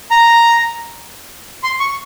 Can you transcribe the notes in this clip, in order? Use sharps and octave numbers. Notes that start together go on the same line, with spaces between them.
A#5
C6
C#6